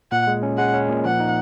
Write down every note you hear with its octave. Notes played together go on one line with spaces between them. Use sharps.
A#2 F#5
G#3
C#4
G#3 F#5
C#4
A#2
F3 F#5
D#4